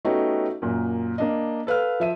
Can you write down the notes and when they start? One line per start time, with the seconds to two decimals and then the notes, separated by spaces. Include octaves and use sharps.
0.05 A3 B3 C#4 D#4 F#4 G4
0.62 F#2 A#2
1.18 A#3 D4 D#5
1.67 A4 B4 F5 F6
2.00 F3 E5 D#7